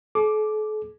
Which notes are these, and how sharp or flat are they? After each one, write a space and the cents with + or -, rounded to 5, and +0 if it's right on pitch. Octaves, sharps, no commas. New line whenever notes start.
A4 -45 D6 +0